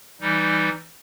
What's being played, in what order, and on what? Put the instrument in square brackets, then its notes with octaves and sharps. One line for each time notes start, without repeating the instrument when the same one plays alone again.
[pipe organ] E3 G3 D#4